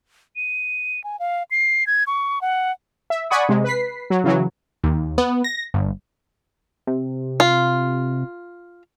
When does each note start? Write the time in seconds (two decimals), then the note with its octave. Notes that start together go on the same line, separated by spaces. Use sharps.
0.36 D#7
1.04 G#5
1.19 F5
1.51 C7
1.87 G#6
2.07 C#6
2.41 F#5
3.10 E5
3.30 D5 F#5 G#5 B5 C#6 D#6
3.49 C3 G#3
3.64 B4 B6 C7
4.10 F#3
4.24 C#3 E3 F#3
4.84 D#2
5.18 B3
5.44 A#6
5.74 G1
6.87 C3
7.40 F4